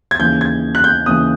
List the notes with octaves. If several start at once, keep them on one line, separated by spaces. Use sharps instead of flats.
G#6
D#2 C#3 E3 G6
G#6
F#6
G6
D#2 C#3 E3 D#6